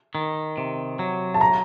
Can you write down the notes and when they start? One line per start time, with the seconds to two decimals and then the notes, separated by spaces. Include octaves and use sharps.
0.15 D#3
0.58 C3
0.99 F#3
1.34 A5
1.41 A#5